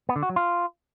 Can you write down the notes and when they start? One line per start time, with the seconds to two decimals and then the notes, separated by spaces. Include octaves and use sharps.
0.09 B3
0.16 D3
0.23 F#4
0.29 F#3
0.36 F4